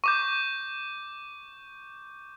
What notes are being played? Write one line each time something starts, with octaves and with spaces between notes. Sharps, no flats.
C#6 D6 G6